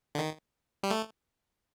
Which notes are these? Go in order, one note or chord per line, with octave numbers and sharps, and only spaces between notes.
D3
D#3
G3
A3